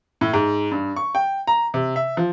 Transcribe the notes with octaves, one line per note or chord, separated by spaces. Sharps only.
A2
G#2
G2
C#6
G5
A#5
C3
E5
F3